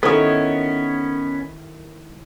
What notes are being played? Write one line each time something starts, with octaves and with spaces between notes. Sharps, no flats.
D#3 B3 C#4 E4 A4 A#4 C5 C#5